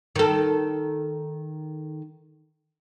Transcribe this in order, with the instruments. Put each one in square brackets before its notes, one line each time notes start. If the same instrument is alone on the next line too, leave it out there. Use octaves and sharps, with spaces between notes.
[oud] D#3 A4